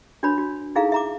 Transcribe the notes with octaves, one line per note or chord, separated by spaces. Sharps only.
D4 F#4 A#4 C#5 B5
F#4
D#4 E4 G#4 A4 F5 A#5
E5 A#5 D6